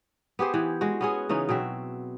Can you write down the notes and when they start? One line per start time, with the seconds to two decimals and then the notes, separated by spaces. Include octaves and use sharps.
0.39 B3 G4 G#4 C5
0.54 E3
0.81 G#3 F#4
1.01 B3 C#4 G#4
1.29 C#3 E3 C#4 D#4
1.49 B2 F#3 C4 E5